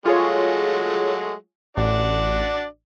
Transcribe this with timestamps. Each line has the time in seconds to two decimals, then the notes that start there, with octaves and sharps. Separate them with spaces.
0.06 F#3 G#3 A3 F4 G#4 C#5
1.77 A1 D4 F#4 D5